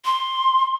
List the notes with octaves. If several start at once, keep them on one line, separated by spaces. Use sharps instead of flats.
C6